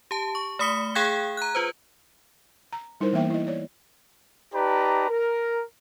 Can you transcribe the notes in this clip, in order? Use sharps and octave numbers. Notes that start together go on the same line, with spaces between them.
G4 A5
C#6
A3 B5 D#6 B6 C#7 G7
G#4 F5 G5 F#6 G#6
A#5 F#6
F4 B4 C5
A#5
G3 D#4 E4 A#4 C5
E3 A#3 B3 E5 G5
E4 D#5
C#5 D5
D#4 G4 B4 D5 A5 A#5
A#4